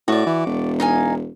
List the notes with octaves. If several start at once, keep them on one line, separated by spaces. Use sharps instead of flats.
A2 F#4 D5
E3
E1
D#4 F5 G#5